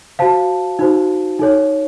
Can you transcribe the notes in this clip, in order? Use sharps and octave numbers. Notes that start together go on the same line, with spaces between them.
F#4 C5 F5 A5
D#4 F#4 C5
D#4 A4 C#5